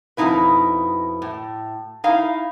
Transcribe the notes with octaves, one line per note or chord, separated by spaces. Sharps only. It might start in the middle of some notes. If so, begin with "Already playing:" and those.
F2 B2 D#3 D#4 E4 B4
A2
D#4 E4 F5